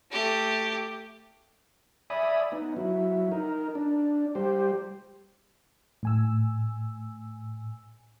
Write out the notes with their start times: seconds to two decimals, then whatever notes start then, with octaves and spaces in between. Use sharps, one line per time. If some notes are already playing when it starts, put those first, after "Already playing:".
0.11 A3 G4
2.10 D5 E5 G#5 B5 D#6
2.52 B3 D#4
2.77 F#3 E4
3.31 D#4 A#4
3.75 D4
4.35 G3 G4 C5
6.03 A2 G#5 E6